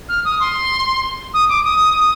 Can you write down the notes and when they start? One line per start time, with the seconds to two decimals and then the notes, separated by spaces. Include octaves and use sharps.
0.09 F6
0.25 D#6
0.40 C6
1.34 D#6
1.49 D6
1.64 D#6